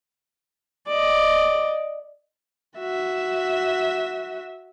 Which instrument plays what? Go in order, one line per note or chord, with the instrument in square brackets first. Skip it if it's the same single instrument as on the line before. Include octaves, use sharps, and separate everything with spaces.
[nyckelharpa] D5 D#5
[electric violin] F#4 E5